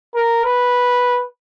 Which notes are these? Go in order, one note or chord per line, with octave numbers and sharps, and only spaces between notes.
A#4
B4